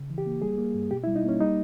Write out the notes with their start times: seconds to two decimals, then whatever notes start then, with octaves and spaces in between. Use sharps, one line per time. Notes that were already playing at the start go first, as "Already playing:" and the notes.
Already playing: C#3
0.10 E3
0.18 G4
0.26 A#3
0.42 G3 G#4
0.58 A#3
0.74 G2
0.91 B2 G4
1.04 E4
1.07 G3
1.16 D#4
1.25 A#3 C#4
1.40 G3 D#4